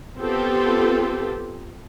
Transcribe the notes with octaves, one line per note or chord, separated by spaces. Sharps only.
B3 C4 F4 G4 A4